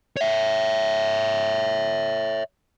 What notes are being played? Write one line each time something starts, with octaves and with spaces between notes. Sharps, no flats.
C#5 E5